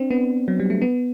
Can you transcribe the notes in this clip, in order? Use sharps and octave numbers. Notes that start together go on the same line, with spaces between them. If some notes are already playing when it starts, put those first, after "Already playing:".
Already playing: C4 D4
B3
F#3
G3
A3
B3